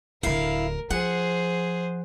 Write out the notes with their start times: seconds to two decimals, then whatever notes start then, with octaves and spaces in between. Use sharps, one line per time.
0.23 D1 D3 E4 A#4 F5
0.90 F3 G#4 C5 F#5